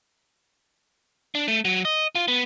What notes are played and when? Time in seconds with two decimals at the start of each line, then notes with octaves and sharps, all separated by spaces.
1.35 D4
1.48 A3
1.65 F#3
1.85 D#5
2.15 F4
2.28 B3